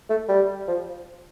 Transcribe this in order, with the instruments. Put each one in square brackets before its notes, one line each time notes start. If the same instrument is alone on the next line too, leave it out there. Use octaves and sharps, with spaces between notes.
[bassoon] A3
G3
F3